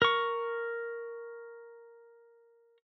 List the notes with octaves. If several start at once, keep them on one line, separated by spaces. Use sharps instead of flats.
A#4 C#6